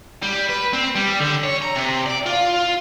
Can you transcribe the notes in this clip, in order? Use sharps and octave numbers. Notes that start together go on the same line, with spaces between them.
G3
B4
C4
G3
D3
C#5
A#5
C3
D5
F4